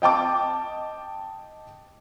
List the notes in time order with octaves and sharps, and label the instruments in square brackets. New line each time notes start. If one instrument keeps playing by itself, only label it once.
[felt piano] D#5 G5 A5 D6